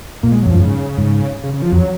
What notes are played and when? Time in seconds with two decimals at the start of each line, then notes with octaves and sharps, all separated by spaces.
0.23 A#2 A#3
0.32 G#3
0.42 F#3
0.46 F2
0.51 F#2 F3
0.60 G#2 C#3
0.98 G#2
1.43 C#3
1.54 C#3
1.62 F3
1.72 F2 F#3